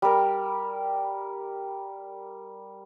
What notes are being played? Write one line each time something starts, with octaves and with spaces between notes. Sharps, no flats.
G3 A#4